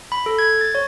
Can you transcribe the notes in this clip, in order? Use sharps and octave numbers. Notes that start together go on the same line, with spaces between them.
B5
A4
G#6
A6
C#5